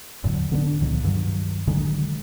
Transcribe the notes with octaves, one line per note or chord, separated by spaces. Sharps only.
E1 A2 D3 F#3
D3 B3 D4
C#2 A#2 D#3 F3
G2 D#3 F#3
D3 D#3 F#3 G#3